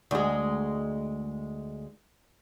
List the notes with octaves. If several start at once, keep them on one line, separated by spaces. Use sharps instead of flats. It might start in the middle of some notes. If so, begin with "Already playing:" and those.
D2 G#3